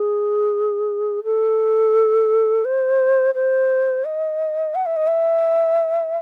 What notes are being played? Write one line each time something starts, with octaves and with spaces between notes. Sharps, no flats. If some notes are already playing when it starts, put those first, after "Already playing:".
Already playing: G#4
A4
C5
C5
D#5
F#5
E5
D#5
E5